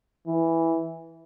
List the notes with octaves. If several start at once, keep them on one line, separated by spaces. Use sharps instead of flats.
E3